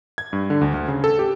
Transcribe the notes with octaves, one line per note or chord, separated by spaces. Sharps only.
G#6
G2
D3
D2
D2
C#3
A4
G4